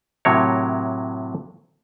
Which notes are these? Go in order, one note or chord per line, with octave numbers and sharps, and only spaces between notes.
A2 C3 F#3 A#4 C#5